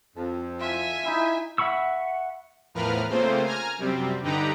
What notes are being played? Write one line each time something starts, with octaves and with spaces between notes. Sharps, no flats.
F2 A5
F4 E5 G#5
D#4 E4 F5
E5 F#5 B5 C#6 E6
E2 A2 F3 A#4 B4 F6
C#3 A3 A#3 C4 F4 C5
G#5 A#5 F6
F#2 C3 G3 C4
G2 D3 D#4 G4 B4 A#5